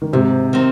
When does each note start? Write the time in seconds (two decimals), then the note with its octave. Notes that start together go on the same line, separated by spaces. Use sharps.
0.02 D#3
0.13 G#2 C3
0.53 D#3 C4